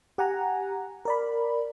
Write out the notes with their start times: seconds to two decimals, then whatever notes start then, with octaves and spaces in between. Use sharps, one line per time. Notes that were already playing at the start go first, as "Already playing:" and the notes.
0.18 G4 F#5 G#5 A#5
1.05 A#4 D5 B5